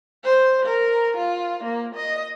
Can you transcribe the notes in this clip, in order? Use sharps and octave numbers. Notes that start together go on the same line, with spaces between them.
C5
A#4
F4
A#3
D#5